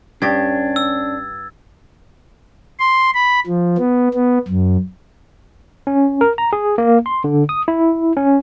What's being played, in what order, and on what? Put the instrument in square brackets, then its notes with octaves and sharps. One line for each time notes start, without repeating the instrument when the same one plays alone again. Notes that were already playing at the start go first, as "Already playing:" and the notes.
[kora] G2 G4 [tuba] C#4 [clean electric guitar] D4 [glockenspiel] G#6 A6
[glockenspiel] E6
[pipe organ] C6
B5
F3
B3
B3
F#2
[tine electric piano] C#4
A#4
A#5
G#4
A#3
C6
D3
D#6
E4
C#4